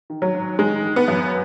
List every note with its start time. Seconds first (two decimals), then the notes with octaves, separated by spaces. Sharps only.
0.10 D#3
0.22 F#3
0.35 G#2
0.59 D#3 G#3
0.83 D#3
0.96 B3
1.08 F#2